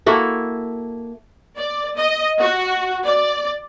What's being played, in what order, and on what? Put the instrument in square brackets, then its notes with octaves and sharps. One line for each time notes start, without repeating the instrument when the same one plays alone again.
[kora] A#3 E4 F#4 A4
[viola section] D5
D#5
F#4
D5